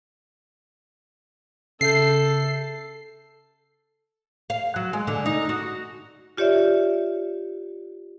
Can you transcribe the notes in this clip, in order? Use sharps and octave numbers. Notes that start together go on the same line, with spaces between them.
C#3 A4 E5 G6 C7
F5
F#3
G#3
D3
D#4
F#4
F4 G4 C#5 D5 E5